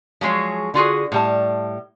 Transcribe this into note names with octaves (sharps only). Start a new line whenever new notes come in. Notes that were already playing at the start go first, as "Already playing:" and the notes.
F3 F#3 G#3 G#4 C#5
D3 F4 F#4 G#4
A2 G3 A5